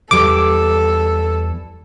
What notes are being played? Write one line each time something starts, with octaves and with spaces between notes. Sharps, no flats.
E2 E3 G3 A4 D6